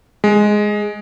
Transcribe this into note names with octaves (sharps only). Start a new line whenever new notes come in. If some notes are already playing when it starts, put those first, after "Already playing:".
G#3